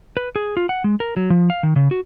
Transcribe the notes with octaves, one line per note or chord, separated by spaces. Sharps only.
B4
G#4
F4
F#5
G#3
A#4
F#3
F3
F5
D#3
C#3
F#4